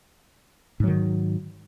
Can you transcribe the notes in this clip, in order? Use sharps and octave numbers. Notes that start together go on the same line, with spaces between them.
G#2 D#3 F#3